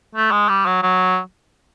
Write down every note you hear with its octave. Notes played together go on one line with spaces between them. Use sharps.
A3
G#3
G3
F#3
F#3